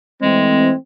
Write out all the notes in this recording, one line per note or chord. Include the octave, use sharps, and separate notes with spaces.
E3 G#3 A3 C4